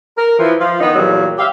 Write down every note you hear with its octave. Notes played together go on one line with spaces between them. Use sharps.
A#4
E3 F3
F3 F4
D#3 B3 D#4
E2 A#2 F#3 G3
G4 E5 F5